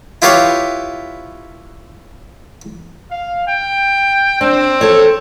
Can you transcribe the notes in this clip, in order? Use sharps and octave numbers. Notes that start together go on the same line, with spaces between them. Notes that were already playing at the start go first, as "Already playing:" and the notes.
E4 F4 G4 B4 C#5 F5
F5
G5
C4 D4
A4 C#5